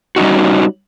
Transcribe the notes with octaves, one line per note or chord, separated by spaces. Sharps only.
G3 C#4 D#4 F#4